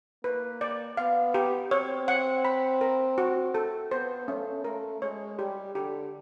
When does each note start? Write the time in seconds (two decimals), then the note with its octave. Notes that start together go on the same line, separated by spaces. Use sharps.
0.24 A#3 B4
0.61 D5
0.97 B3 F5
1.34 G4
1.71 C4 C#5
2.08 F#5
2.45 B5
2.81 A#4
3.18 F#4
3.55 A4
3.91 B3 C5
4.28 A3 C#4
4.64 A3 A#4
5.01 G#3 C#5
5.39 G3 G4
5.75 D3 G4